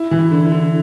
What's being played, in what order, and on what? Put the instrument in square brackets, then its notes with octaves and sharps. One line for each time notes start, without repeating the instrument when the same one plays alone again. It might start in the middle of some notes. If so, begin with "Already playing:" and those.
Already playing: [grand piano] E4
[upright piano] E3
[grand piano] E4
[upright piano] D3
[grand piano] E4
[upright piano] D3